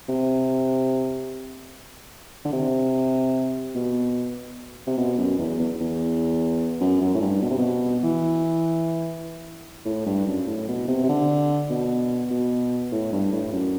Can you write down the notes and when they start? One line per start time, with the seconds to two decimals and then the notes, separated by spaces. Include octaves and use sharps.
0.09 C3
2.45 D3
2.52 C3
3.75 B2
4.87 C3
4.98 B2
5.18 F#2
5.39 E2
5.59 E2
5.80 E2
6.80 F#2
7.01 F#2
7.15 A2
7.21 G2
7.42 B2
7.50 C3
7.58 B2
8.03 E3
9.86 A2
10.06 G2
10.26 F#2
10.47 A2
10.68 B2
10.88 C3
11.03 C3
11.09 D3
11.70 B2
12.31 B2
12.92 A2
13.12 G2
13.32 A2
13.52 F#2